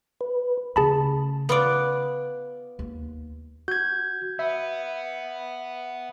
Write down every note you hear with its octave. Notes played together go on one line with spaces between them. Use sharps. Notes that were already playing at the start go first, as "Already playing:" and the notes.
B4
C#3 A3 G#4 A5 B5
B3 F4 D5
D#2
F#4 G6 G#6
B3 E5